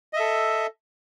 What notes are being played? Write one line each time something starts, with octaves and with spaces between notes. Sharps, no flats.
A4 D#5 E5